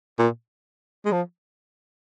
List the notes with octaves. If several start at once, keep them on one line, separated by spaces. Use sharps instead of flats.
A#2
G#3
F3